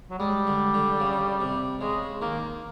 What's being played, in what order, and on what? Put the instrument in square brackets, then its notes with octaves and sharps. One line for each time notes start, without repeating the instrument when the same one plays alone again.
[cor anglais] F#3
[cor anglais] G3 [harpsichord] G#3
[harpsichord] D3
D3
C#3
C3
[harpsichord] C#3 [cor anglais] G#3
[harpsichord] D#3 [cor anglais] A#3